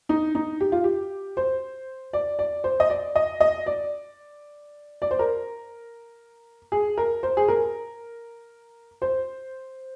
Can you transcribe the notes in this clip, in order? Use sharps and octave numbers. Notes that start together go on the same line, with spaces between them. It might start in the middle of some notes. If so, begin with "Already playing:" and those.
D#4
D#4
G4
F4
G4
C5
D5
D5
C5
D#5
D5
D#5
D#5
D5
D5
C5
A#4
G#4
A#4
C5
G#4
A#4
C5